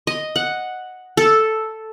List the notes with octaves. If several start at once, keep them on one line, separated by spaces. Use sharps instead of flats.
D#5
F#5
A4